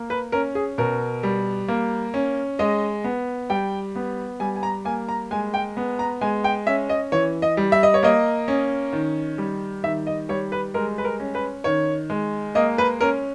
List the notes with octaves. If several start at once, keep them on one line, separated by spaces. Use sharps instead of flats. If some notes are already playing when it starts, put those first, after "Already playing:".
Already playing: A#3
B4
C#4 A#4
G#4
B2 A#4
G3
A#3
C#4
G#3 D#5
B3
G3 G5
B3
G3 G#5
G#5
A#5
A#3 G#5
A#5
G#3 G#5
G5
B3
A#5
G#3 G#5
G5
C#4 E5
D#5
E3 C#5
D#5
G3
E5
D#5
C#5
A#3 D#5
C#4
D#3
G3
D#3 E5
D#5
G3 C#5
B4
G#3 A#4
B4
A#4
C#4
B4
D#3 C#5
G#3
A#3 D#5
B4
C#4 A#4